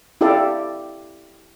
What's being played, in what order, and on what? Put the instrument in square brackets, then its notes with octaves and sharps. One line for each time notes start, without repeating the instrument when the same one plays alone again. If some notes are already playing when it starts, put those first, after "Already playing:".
[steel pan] E4 G4 A4 D5 F5